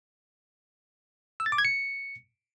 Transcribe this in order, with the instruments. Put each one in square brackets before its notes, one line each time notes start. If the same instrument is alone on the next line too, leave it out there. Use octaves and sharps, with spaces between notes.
[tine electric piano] E6
A6
D6
G#6
C#7